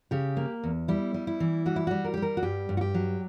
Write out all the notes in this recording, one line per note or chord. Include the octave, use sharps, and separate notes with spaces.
C#3 G4
A#3
E2
G3 E4
G3
E4
E3
G3 F#4
E4
G3 F#4
A#4
G3 G4
A#4
F#4
G2 G4
G2
F#4
G4
F#3